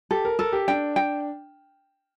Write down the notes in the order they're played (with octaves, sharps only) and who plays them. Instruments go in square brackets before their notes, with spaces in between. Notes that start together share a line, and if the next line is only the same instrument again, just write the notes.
[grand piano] G4 [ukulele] A4
[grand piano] A#4
[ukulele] A4 [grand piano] A#4
[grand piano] G4
[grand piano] D4 [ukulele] G5
[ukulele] G5